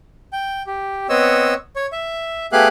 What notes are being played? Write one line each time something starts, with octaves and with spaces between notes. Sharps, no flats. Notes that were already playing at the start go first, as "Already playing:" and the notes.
G5
G4
B3 C4 C#5 D#5 E6
C#5
E5
A3 B3 G4 G#4 F5 F#6